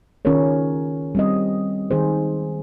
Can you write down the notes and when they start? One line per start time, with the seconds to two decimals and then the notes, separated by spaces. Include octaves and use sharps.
0.25 D#3 C#4 F4 G#4 A#4 C#5
1.15 G3 C4 D#5
1.91 D#3 D#4 G#4 C5